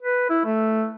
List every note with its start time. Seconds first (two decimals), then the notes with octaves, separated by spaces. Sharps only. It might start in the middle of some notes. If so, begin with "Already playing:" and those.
0.02 B4
0.30 E4
0.45 A3